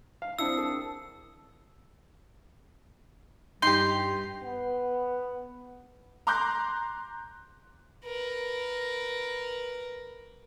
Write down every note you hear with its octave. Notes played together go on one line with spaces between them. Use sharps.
F5
C4 D4 E4 D#6 E6 C7 C#7
G#4 A#4 A5
G2 D#4 G4 C6 G6 C7
B3
A#5 C6 D6 F#6 G6 A#6
A#4 B4